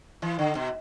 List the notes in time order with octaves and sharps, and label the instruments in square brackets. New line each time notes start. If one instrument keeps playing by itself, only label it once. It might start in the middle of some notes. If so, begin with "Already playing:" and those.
[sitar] E3
D3
B2